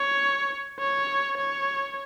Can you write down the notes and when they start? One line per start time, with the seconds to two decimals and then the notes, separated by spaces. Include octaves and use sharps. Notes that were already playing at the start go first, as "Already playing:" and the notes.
Already playing: C#5
0.79 C#5
1.37 C#5